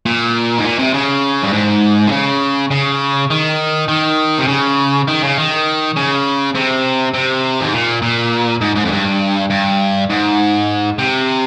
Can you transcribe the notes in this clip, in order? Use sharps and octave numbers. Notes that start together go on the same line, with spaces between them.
A#2
G#2
A#2
C3
C#3
G2
G#2
C3
C#3
C#3
D#3
D#3
C3
C#3
D#3
C#3
D#3
C#3
C3
C3
G#2
A#2
A#2
G#2
G#2
F2
G2
G2
G#2
C3